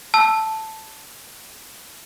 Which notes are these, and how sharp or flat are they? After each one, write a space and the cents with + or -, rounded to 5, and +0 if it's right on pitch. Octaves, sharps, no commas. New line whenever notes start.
A5 +0 E6 +0